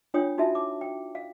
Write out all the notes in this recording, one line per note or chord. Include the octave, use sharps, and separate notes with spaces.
D4 F4 C#5 G5 D#6
D#4 F4 F#4 E5 A5
D6
G5
F5